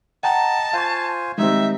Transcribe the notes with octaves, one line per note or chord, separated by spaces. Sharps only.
D#5 F#5 G5 A5 A#5
F4 C5 F5 G#5 C#6
D#3 G3 G#3 C4 D#4 E5